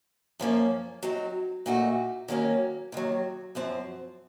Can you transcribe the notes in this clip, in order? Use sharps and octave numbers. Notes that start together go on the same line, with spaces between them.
F#2 F3 A#3 C#4
F#3 C4 D#4
A#2 A3 D#4 F#4
D#3 F#3 A#3 C#4
D#2 D#3 F#3
F#2 F3 C4